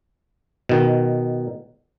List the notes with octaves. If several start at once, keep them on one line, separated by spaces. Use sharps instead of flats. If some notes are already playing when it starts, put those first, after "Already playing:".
B2 D#3